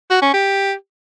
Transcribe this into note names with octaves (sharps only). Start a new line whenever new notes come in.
F#4
C#4
G4